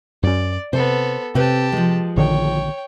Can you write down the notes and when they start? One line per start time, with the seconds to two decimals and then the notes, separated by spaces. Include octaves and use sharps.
0.23 F#2 C#4 D5
0.73 C3 B3 A4 C5
1.35 C3 C4 G4 B4 A5
1.72 F3 G#3
2.16 A#1 D3 D#3 C#5 G5